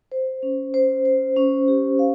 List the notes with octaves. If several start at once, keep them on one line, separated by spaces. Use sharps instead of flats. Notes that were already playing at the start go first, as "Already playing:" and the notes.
C5
C#4
C5
C5
C#4
G4
F5